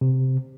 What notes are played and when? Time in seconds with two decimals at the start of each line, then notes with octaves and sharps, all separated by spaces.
0.01 C3